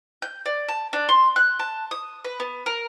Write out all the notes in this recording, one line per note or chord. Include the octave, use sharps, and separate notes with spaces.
G6
D5
A5
D4
C6
F#6
A5
D#6
B4
B3
A#4